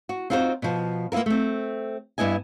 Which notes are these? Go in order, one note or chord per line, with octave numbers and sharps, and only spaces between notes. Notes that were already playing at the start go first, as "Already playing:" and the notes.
F#4
C4 D#4 F4 F#4 A#4 C5
B2 F3
A#3 B3 E4 F4 A#4
A3 C4
G2 B3 E4 D#5 G#5